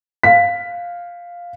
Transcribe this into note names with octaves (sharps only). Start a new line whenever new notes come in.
F5 B6